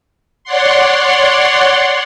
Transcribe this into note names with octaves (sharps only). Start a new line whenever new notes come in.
C#5 D5 F#5 C6